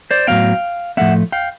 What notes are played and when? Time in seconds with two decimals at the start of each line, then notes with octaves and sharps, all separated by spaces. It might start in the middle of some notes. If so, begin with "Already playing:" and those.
0.11 C5 D5
0.27 A2 F#3 B3 F5 G5
0.97 A2 F3 A3 C4 E5 F#5
1.32 F5 G5